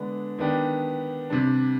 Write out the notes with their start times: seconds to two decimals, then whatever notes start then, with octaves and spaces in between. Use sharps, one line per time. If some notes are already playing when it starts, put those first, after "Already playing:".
Already playing: D3 G#3 B3 D4
0.39 D#3 B3 D4 G4
1.30 C3 G3 D4